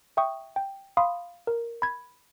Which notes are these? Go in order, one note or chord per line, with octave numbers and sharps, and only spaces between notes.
E5 G5 C#6 D#6
G5
F5 B5 C6 D#6
A#4
B5 G#6